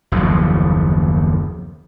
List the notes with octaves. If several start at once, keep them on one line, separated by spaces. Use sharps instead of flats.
F#1 D#2 B2 F3